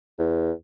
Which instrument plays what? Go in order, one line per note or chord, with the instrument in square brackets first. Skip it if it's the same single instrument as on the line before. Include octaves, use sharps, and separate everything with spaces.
[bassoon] E2